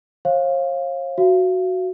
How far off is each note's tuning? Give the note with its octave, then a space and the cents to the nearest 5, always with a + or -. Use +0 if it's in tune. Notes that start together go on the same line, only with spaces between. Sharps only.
C#5 -45 F5 +0
F#4 +0 F5 -40